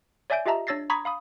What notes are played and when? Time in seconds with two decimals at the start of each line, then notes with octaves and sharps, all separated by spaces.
0.30 C#5 D5 E5 G#5 G6 D7
0.46 F4 G4 D#5 E5 A5 A#5
0.67 D4 C#5 E6 A6 A#6 C7
0.90 A#5 B5 C#6 D#6 G#6 B6
1.05 F5 B5 D#6